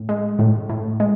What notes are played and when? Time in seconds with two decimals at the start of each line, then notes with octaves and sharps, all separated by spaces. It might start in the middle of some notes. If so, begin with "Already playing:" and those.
Already playing: A2
0.09 G#3
0.39 A2
0.69 A2
1.00 G#3